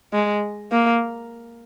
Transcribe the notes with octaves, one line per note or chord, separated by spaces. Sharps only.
G#3
A#3